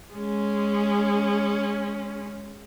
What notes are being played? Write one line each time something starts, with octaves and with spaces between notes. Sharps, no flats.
G#3 C#4